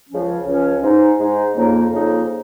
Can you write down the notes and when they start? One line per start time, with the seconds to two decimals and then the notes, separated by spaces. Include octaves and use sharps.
0.09 C#2 C#3 F3 C#4
0.46 C#2 C#3 F3 C#4
0.82 G#2 G#3 D#4
1.19 G#2 G#3 D#4
1.55 F2 C#3 A#3 D#4
1.92 F2 C#3 A#3 D#4